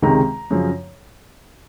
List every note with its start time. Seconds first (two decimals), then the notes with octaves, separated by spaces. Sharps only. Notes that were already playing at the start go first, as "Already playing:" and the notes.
0.02 C#2 C3 D#3 G#3 A#5
0.50 F#2 C#3 F3